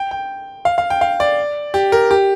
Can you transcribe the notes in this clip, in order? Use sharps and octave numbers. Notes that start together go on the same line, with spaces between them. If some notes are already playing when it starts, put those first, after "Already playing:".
Already playing: G5
G5
F5
F5
G5
F5
D5
G4
A#4
G4